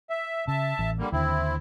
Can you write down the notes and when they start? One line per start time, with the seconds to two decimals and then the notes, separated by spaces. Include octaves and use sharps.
0.10 E5
0.48 C#3 E5 A5
0.79 A1
0.99 D3 G3 A#3
1.12 D#2 D3 C4 E4